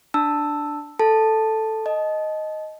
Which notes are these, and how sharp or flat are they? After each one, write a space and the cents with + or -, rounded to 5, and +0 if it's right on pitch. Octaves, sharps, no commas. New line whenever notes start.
D4 +0 A5 +10 E6 +0
A4 +0 A5 +0
D#5 +0 A5 -25